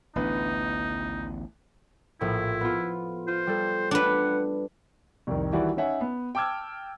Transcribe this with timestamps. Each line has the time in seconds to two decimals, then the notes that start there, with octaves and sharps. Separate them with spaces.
0.16 A1 D2 D3 E3 B3 D#4 B4
2.21 A#1 A2 E4
2.61 B3 F4
3.28 F4 C5
3.47 G3 A4
3.91 D4 B4 F#5
5.27 C2 F2 D#3
5.52 D#3 E3 G3 E4 F#4 D5
5.77 C#4 D#4 C#5 E5 F#5 G#5
6.01 B3
6.35 G5 A5 D6 E6 F6 G#6